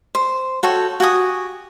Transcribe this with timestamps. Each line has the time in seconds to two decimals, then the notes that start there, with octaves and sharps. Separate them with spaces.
0.15 C5
0.63 F#4 A4 C#5 G5
1.00 F#4 G4 G#5 D#6